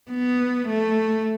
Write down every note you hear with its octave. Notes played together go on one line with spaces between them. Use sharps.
B3
A3